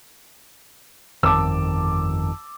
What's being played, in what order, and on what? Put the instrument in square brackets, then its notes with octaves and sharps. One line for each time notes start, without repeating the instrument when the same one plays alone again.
[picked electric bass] G1 F2 D#3 [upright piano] A5 D6 E6